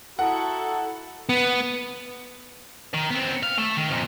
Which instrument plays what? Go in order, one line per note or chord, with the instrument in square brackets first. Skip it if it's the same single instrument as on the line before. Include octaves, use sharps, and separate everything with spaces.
[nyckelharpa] E4 [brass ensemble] F#4 A4 [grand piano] F#5 [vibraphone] A5 A#5 D#6
[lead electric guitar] B3
[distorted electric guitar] D#3
B3 C4
F5
A3
D#3
F2 A#2